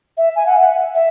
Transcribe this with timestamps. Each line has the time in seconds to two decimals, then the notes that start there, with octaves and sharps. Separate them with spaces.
0.17 E5
0.36 G#5
0.46 F#5
0.57 E5
0.95 E5